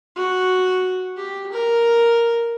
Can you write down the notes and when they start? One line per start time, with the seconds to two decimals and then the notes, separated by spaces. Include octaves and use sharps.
0.16 F#4
1.17 G4
1.52 A#4